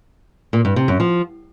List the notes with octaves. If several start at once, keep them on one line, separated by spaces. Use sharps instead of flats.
A#2
G2
C3
F#2
F3